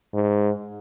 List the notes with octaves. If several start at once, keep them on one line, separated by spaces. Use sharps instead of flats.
G#2